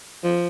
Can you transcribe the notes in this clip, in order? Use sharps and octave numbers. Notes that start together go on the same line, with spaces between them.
F3